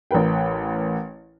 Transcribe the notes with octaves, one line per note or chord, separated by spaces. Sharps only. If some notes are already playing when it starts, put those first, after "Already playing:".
A1 A#4 B4 G5